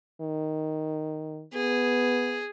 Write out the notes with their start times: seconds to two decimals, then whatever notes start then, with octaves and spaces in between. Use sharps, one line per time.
0.21 D#3
1.54 B3 G#4